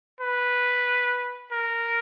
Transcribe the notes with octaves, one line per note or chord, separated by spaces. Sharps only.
B4
A#4